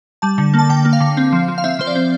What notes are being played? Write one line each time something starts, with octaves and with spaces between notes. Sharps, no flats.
G3 A5
D3
A#3
A5
D3 G5
A#3
F5
D3
C4
F3
F3
F5
C4 E5
F3 C5
D5
C4